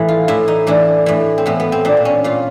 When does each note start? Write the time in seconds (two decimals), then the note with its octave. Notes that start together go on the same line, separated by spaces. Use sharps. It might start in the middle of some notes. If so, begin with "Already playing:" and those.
Already playing: A2 E3
0.08 F4
0.28 A2 E3 E4
0.48 D#4
0.67 A2 E3 D4
1.06 A2 E3
1.38 C4
1.46 A2 E3 B3
1.60 B3
1.72 C4
1.85 A#2 D4
1.97 C4
2.05 C#4
2.24 A#2 F4